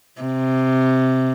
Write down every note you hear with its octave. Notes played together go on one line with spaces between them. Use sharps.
C3